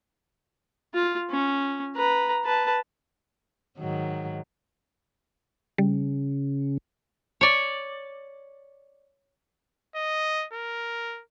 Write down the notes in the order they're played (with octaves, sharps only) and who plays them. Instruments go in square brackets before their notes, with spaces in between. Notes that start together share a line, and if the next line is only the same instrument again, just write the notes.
[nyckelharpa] F4
C#4
B4 A#5
B4 A5
[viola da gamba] G#2 D#3 F#3
[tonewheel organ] C#3 [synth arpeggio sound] G3
[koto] C#5 D5
[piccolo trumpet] D#5
A#4